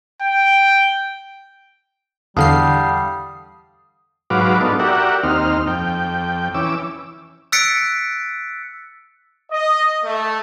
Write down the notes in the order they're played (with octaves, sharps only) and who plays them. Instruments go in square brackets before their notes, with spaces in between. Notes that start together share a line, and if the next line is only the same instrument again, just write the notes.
[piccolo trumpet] G5
[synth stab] E2 D3 C7 [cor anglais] G3 [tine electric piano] F5 F#5 A5 [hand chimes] D#6
[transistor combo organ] G#2 F#3 F#4 B4 F5 D6
B3 D4 D#4 F4 A4
F#4 G4 A#4 D5 E5 F#5
D#2 C4 D#4 F6
F2 G5
E3 C#4 D6 E6
[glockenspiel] E6 F#6 A6 B6 C#7 D7
[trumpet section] D#5
A3